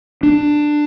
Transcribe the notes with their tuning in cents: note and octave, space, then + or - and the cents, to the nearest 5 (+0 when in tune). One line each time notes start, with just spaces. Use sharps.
D4 +15